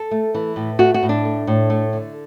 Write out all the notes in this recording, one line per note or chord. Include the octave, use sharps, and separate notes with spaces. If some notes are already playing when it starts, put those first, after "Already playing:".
Already playing: A4
A3
E3
A2
A3 F#4
F#4
A2
D4
A3
A2
A3
D3